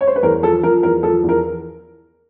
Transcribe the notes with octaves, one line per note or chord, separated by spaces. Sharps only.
C#5
C5
B4
E2 A#4
F3 A4
F3 A#4
E2 A#4
F3 A4
E2
A#4